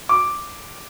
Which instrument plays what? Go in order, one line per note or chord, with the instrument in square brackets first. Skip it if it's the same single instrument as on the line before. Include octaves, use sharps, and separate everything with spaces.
[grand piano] D6